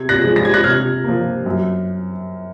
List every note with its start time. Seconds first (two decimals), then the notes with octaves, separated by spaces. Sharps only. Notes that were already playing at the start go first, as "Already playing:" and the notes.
Already playing: C3 G#6
0.09 F#6 A#6
0.22 F3 G#3
0.36 A#6
0.45 G#6
0.54 F#6 A#6
0.63 C3 F6 G#6
1.04 F3 A#3
1.46 F#2